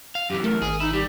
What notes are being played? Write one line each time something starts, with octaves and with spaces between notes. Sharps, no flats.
F5
F#2 E3 G4
A3 A#4
G#1 G#4
D#4 E4
G3 G4